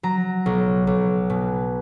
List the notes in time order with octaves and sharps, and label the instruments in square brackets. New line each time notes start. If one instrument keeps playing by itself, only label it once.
[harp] F#3 A#5
B1
B1
B2